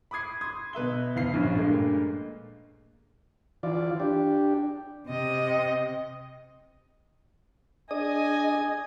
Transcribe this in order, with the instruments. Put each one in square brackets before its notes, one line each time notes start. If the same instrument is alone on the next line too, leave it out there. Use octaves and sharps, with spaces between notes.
[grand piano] B5 D6 D#6 G#6 C7
C6 D#6 G#6
B2 B4 E5 G7
F#1 E2 B3 F5 C7
A#1 G2 F3 C#4
G2 A#2 G#3 A3
[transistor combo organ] E3 F4 D5
D4 G4
[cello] C3 D#5
[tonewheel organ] D4 G#4 D#6 [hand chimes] D5 [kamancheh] D#5 [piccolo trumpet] G#5